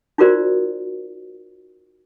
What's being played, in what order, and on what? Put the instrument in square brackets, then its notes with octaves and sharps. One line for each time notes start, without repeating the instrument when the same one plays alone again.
[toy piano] D#4 F4 F#4 A#4 C5 D5